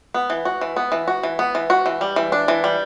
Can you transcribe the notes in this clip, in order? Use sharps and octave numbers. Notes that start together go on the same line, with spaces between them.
B3
E3
F#4
E3
B3
E3
F#4
E3
B3
E3
F#4
E3
G3
E3
D4
E3
G3